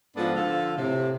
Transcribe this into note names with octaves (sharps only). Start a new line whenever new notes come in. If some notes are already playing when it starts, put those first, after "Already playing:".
G#2 F3 B3 D4 A4
D3 F3 F4 A4
A2 C3